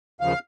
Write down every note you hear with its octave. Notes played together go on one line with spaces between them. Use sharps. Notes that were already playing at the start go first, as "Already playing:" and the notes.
D#2 C#3 F3 F5